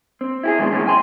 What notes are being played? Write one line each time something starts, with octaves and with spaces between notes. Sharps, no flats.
C4
E4 G4 G#4
B2 D#3 G#3 B3 C4 D4
C#3 E3 F#3 A3 C4 C#4
G5 G#5 C6